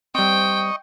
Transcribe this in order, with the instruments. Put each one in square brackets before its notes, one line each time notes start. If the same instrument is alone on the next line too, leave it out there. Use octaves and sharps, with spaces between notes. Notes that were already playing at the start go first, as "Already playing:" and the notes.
[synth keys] G3 C4 [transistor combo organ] D#5 C#6 [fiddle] G5